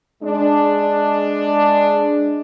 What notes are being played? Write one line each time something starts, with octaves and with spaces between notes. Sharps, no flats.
G#3 D4